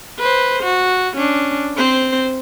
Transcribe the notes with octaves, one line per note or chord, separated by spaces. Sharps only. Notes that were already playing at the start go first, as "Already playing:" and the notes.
B4 C5
F#4
C#4 D4
C4 C5